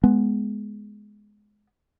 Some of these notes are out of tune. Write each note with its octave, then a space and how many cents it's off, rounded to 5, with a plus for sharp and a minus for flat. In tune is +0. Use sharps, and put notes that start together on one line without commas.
G#3 +10 B3 +0